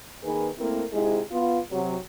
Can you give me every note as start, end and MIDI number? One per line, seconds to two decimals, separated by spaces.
0.24 0.49 51
0.24 0.49 58
0.24 0.49 68
0.24 0.49 71
0.58 0.83 57
0.58 0.83 58
0.58 0.83 60
0.58 0.83 64
0.58 0.83 70
0.92 1.21 44
0.92 1.21 48
0.92 1.21 56
0.92 1.21 64
0.92 1.21 68
1.31 1.58 59
1.31 1.58 65
1.72 1.96 48
1.72 1.96 54